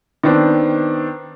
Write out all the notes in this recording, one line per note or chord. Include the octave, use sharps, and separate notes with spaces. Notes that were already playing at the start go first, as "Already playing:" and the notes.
D#3 B3 C4 D4